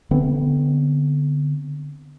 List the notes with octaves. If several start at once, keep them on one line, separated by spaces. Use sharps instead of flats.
D3 B3 C4